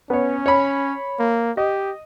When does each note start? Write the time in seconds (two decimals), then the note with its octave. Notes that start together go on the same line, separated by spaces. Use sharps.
0.10 B3 C#4 C#5
0.46 C#5 B5
1.19 A#3
1.57 G4 D#5